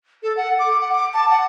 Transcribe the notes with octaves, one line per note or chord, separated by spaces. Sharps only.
A4
F#5
D6
F#5
D6
A5
F#5